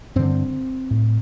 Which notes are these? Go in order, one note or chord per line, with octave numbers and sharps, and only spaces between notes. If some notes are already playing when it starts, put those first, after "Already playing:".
G2 D3 C4
A2